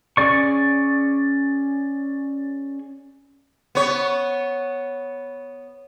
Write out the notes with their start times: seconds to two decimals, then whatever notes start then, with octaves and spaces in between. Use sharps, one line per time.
0.17 C#4 G#4 D5 C#6
3.75 B3 C#5